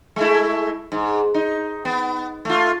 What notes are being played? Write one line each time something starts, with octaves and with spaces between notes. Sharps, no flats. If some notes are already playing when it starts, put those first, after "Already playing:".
G#3 A3 E4
G#2
D#4
B3
A3 F4